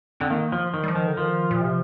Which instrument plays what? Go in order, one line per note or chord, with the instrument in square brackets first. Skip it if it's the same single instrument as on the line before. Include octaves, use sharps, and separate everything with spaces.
[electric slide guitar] D3 [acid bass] C4
[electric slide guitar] D#3 [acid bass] A#3
[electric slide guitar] F3
D#3
[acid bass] G3
F3
[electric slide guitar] D#3
[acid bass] D3
[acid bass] D#3 [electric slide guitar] F3
[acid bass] A#2
C3